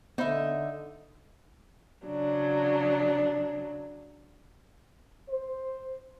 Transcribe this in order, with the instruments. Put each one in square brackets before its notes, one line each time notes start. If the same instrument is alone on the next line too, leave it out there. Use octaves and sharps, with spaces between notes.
[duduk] D3 [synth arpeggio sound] B3 C5 B5 [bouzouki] D#4 E5
[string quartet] C#3 F#3 D4
[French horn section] C5